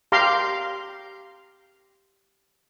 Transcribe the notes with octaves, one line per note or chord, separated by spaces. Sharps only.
G4 F5 A#5 C6 D6